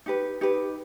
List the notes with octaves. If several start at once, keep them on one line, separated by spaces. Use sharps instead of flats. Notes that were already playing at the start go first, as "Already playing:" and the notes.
D#4 G4 B4
D#4 G4 B4